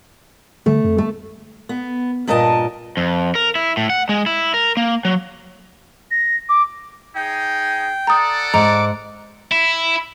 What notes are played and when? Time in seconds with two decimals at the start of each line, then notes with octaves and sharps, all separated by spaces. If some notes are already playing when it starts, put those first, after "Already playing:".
0.66 D3 A3
0.84 F2
0.98 A3
1.69 B3
2.27 G2 A#2 A#4 D#5 A5
2.97 F2
3.35 A#4
3.55 E4
3.77 A2
3.90 F#5
4.09 G#3
4.26 E4
4.54 A#4
4.77 A#3
5.05 F#3
6.11 A#6
6.49 D6
7.16 D#4 G#4 G5
8.07 A4 D5 F#5 A#5 D#6
8.54 G#2 A#5 D6
9.52 E4